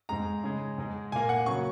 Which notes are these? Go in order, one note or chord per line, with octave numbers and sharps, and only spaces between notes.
G#2 G#3 A#5
C#3 G#3
G#2 G#3
A#2 A#3 G#5
F#5
C#3 F#3 A#3 C#6